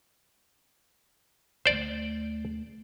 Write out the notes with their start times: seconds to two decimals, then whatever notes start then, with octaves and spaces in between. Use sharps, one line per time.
1.66 D2 A3 C5 D5